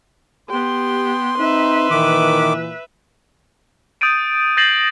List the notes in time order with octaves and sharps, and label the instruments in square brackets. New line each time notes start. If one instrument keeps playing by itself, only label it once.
[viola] B3 G5 [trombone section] G4 [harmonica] C6
[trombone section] C4 D#4 [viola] B4 E5
[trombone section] A#2 E3 [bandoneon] D#3 D6
[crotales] D#6 G6 A6 D7 D#7
G6 A6 A#6 C7 E7 F#7